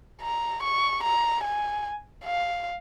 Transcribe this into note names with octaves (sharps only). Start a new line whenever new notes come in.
A#5
C#6
A#5
G#5
F5